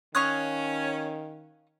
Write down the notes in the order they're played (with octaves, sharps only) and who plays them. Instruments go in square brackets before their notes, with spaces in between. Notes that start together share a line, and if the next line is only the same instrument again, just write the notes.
[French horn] D#3 [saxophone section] C#4 [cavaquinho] F5 C#6 D#6 [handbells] F#6 G#6